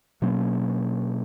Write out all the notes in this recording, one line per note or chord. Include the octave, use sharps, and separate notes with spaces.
B2 F#3 A#3 C#4